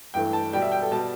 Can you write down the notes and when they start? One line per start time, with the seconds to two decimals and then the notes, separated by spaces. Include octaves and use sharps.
0.14 G2 E3 A3 G5
0.33 A5
0.53 B2 G3 G5
0.62 E5
0.72 G5
0.82 A4
0.91 B2 G3 A5